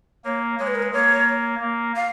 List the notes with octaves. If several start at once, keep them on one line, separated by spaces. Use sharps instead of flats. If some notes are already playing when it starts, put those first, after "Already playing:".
A#3 C#5
G#3 C#5
B4
A#4
B4
A#3 C#5
A#3
F5